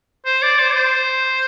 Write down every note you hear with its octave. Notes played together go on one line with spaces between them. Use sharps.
C5
D5
C5
D5
C5